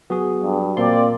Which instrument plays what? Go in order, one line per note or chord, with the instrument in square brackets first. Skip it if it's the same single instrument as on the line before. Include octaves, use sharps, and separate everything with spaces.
[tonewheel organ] F#3 [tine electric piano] B3 F#4 G#4
[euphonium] G2
[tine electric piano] A#2 F4 C6 [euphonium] A#3 [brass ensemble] C4 D5